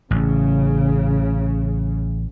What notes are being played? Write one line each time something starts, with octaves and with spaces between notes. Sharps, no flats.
A1 C#3